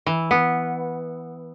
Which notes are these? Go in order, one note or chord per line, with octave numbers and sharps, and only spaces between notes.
E3
B3